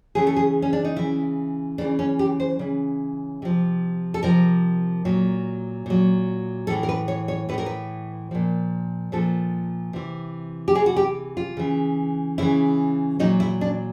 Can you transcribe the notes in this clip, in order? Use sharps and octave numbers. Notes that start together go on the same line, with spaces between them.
C#3 E3 G#4
A4
G#4
C#4
D4
D#4
C#3 E3 E4
C#3 E3 D4
C#4
G4
C5
C#3 E3
C3 F3
A4
C3 F3 A#4
A#2 F#3
A#2 F#3
A2 E3 A4
A#4
B4
C#5
C#5
A2 E3 A#4 B4
B4
A#2 F3
A#2 F3 A4
C3 E3
G4
C3 E3 G#4
F#4
G4
F4
C#3 E3
C#3 E3 E4
A#2 F#3 D#4
E4
D4